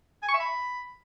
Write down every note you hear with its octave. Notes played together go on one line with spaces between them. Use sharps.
G#5
C#6
E5
B5